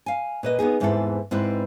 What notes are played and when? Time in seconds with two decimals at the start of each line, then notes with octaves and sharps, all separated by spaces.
0.06 F5 G#5
0.43 A#2 B4 D#5
0.59 B3 D#4 G4 G#4
0.80 E2 G#2 E3 C4 E4 A4
1.31 G#2 C4 E4 B4 D5